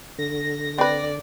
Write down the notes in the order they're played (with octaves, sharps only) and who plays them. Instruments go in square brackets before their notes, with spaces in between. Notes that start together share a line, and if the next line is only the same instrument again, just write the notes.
[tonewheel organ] D3 [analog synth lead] A#6
[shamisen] C4 B4 [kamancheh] D5